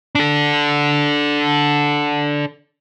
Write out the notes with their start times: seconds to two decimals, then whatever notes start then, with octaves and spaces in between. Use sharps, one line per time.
0.15 D4 A4